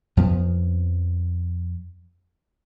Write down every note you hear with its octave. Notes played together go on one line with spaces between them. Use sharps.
F2 F3 B3